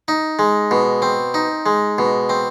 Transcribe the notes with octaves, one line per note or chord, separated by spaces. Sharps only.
D#4
G#3
B2
C4
D#4
G#3
B2
C4